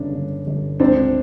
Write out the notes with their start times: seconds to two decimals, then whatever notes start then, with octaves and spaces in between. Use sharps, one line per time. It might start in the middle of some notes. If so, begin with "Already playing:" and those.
Already playing: G1 C#3 D4
0.13 G1
0.47 G1
0.80 C#2 C4 D4